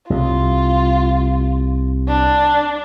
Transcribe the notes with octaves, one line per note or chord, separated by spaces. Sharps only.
C2 F4
D4